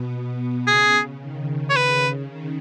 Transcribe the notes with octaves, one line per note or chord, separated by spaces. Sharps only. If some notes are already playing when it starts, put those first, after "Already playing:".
Already playing: B2 B3
B2 B3
C#3 G#4
D#3
C#5
C#3 B4
D#3